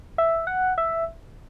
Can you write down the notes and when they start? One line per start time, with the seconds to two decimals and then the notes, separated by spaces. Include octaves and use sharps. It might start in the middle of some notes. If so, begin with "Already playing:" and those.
0.18 E5
0.47 F#5
0.78 E5